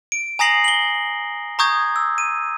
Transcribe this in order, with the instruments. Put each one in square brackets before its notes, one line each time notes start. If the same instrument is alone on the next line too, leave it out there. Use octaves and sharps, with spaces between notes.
[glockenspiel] D7
G#5 A#5 D#6 A#6 C7 F#7
F#7 G7
A#5 C#6 D#6 G6 G#6
E6
D#7